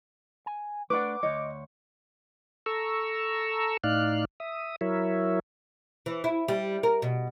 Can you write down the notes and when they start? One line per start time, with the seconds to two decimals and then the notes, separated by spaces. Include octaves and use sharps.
0.46 G#5
0.90 A3 D4 B4 D5 F#5 D6
1.23 D2 C#5 D#5
2.66 A4 A#5 C#6 E6
3.84 A2 D#4 D5 F5 F6 F#6
4.40 E5 D#6
4.81 F#3 E4 A#4 C#5 E5
6.06 E3
6.24 E4
6.48 G3
6.83 A#4
7.02 B2